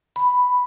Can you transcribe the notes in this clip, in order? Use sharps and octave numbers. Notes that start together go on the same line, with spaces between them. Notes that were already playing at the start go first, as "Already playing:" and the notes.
B5